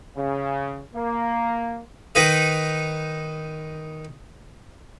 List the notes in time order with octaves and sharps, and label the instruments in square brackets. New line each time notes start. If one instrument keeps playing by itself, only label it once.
[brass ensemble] C#3
A#3
[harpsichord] D#3 D#4 B4 D#5